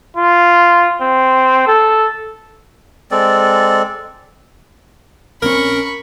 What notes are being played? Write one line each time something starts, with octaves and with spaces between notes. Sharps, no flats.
F4
C4
A4
G#3 C4 A4 D5
A#1 E3 C4 C#4 A#4 B5 C#6